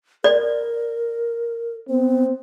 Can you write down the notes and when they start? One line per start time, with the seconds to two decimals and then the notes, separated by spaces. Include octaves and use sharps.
0.24 A#4 D5
1.89 B3 C4